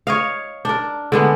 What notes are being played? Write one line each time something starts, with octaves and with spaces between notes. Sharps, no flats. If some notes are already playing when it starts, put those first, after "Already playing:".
C#5 D#5 F5
D4 A#4
D3 G#3 B3